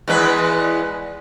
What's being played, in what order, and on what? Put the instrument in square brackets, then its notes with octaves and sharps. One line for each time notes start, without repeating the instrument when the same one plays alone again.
[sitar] E2 G#3 B4